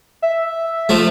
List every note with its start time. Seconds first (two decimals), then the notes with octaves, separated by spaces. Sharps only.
0.22 E5
0.89 F3 A3